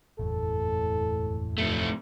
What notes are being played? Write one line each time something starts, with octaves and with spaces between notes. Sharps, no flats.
F#1 E2 A2 A4
F2 A3